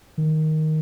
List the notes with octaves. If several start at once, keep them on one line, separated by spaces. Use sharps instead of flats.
D#3